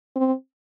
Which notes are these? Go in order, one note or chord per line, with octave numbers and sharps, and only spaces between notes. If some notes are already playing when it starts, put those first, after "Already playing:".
C4